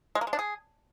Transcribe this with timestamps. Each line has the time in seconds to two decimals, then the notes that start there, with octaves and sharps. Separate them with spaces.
0.15 G#3
0.21 A#3
0.27 G#3
0.33 D4
0.39 G#4